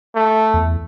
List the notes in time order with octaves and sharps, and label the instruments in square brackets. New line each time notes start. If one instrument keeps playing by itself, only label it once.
[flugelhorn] A3
[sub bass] E2